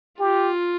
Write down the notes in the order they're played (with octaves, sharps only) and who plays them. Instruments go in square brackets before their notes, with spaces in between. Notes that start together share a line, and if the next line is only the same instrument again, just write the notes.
[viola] F4 [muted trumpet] G4